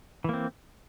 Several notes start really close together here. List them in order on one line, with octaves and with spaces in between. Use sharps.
E3 A#3 C4